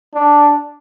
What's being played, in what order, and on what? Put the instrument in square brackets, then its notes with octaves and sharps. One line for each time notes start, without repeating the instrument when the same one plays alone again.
[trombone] D4